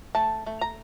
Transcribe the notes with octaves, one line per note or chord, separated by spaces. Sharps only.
A3 A5
A3
A#5